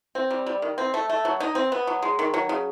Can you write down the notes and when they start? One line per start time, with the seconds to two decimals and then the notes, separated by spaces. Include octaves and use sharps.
0.15 C4
0.31 G3
0.47 G3
0.62 D#3
0.78 C4
0.94 A3
1.10 A3
1.25 F#3
1.40 D#4
1.55 C4
1.72 B3
1.87 F#3
2.02 G#3
2.19 D#3
2.34 F#3
2.49 C#3